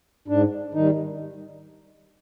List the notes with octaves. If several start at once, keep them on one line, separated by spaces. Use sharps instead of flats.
G#2 D4
D#3 G3 D#4